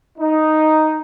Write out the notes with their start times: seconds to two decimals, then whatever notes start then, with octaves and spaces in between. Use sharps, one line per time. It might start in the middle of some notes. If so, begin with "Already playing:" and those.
0.18 D#4